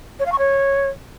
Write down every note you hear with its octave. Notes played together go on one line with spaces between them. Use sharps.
C#5
F5
C#6
C#5